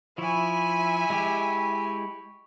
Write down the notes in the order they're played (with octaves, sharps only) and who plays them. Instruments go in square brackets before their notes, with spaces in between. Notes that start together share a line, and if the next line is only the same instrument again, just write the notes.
[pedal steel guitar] F3 E4 [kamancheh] E5 G#5 [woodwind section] B5 C#6
[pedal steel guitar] G#3 E4 G4